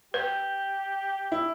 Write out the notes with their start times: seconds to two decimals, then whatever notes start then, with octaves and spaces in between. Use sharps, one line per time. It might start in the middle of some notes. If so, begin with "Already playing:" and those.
0.14 G4 B4 G6
1.32 E4